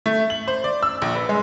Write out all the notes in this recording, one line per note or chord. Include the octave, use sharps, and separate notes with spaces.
A3
F#7
C5
D5
E6
A#1
B4
G#3